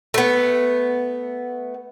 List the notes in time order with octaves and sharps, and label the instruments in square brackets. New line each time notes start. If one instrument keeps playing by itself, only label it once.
[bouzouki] A3 B3